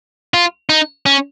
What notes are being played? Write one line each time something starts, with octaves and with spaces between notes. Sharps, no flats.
F4
D#4
C#4